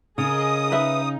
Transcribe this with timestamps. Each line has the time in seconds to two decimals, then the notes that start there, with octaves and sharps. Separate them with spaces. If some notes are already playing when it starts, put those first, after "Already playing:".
0.18 C#3 G#4 A#4 D#5 D#6
0.72 D#4 B4 E5